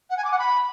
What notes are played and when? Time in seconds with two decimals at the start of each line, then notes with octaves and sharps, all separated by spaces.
0.10 F#5
0.17 G#5
0.24 D6
0.32 F#5
0.39 B5